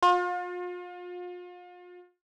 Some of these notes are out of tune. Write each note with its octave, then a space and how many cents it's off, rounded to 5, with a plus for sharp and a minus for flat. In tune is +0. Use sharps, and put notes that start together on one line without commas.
F4 +35